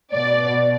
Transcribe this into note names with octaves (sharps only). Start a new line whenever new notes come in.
B2 D5